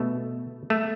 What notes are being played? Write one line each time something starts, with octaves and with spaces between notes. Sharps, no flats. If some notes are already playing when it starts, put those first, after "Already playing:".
Already playing: B2 A3
A3